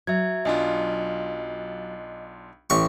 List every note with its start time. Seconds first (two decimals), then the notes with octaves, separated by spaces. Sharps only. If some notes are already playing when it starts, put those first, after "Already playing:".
0.07 F#3 E5 G#6
0.45 B1 D4 F4 D#5 G#5
2.70 A1 G4 C#6